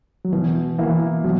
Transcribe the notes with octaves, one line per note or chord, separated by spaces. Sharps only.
F#3
B2 E3
E3 A#3 E4
B2 F#3